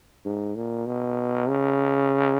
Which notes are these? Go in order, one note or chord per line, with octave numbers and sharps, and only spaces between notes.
G#2
A#2
B2
C#3